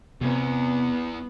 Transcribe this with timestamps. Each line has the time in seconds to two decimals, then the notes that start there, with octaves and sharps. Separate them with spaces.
0.21 E2 C3 B3